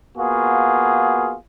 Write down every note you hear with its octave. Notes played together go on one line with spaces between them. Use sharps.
A#3 B3 F4 F#4 G#4